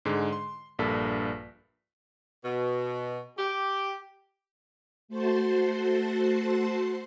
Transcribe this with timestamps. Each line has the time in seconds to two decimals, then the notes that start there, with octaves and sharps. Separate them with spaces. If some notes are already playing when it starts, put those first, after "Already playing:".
0.05 G#2 D3 G#3
0.32 C6
0.79 A#1 G2 A#3 A4 B6
2.44 B2
3.37 G4
5.08 A3 F#4 C5 A5 C6